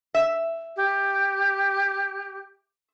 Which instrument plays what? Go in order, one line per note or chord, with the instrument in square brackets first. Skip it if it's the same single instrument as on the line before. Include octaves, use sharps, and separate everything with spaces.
[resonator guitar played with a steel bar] E5
[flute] G4